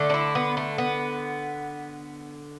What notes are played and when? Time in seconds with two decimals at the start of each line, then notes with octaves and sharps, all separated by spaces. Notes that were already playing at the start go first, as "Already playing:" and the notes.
Already playing: D3 A3
0.10 D4
0.14 E4
0.35 B3
0.57 A3
0.78 B3